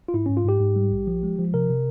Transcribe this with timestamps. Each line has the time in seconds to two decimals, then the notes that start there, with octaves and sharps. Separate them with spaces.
0.08 F4
0.14 G#2 E4
0.26 G#2 C#4
0.37 F4
0.45 G#2 G4
0.60 G#2
0.76 G3
0.92 A#1
1.07 F3
1.23 G#3
1.39 F3
1.54 C3 A#4
1.69 C3